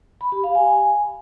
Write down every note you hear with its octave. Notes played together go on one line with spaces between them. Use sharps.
B5
G4
F5
G#5